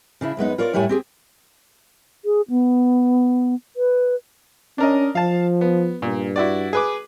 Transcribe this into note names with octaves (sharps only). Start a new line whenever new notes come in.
C#3 D4 E4
F#2 G#3 B3 D#4
F4 A#4 C#5 D5
F#2 A2 G3 E4 C#5 G#5
C4 G4 G#4
G#4
B3
B4
C#4 D4 A#4 D#5
F3 F5 A5
B3
G2 A#2
E4 F#4 D5
G#4 B4 D6